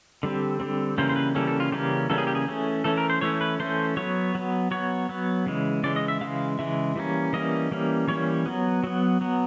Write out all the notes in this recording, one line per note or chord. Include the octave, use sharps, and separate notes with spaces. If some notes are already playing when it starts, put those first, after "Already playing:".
D3 G3 C4
D3 G3 C4
C#3 E3 G3 A#3 C#4 C5
C5
B4
C#3 E3 G3 A#3 C#4 A4
A4
F4
C#3 E3 G3 A#3 C#4 G4
C#3 E3 G3 A#3 C#4 A4
G#4
G4
G#4
E3 A3 C#4
E3 A3 C#4 A4
A#4
C5
E3 A3 C#4 C#5
B4
E3 A3 C#4 C5
F#3 B3 C#5
F#3 B3
F#3 B3 C#5
F#3 B3
C#3 E3 G#3
C#3 E3 G#3 D5
D#5
E5
C#3 E3 G#3 F5
C#3 E3 G#3 E5
E3 G3 A#3 C#4
E3 G3 A#3 C#4 D#5
E3 G3 A#3 C#4
E3 G3 A#3 C#4 C#5
F#3 B3
F#3 B3
F#3 B3